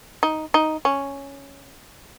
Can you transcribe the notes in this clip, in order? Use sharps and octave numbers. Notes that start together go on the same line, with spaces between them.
D#4
D#4
C#4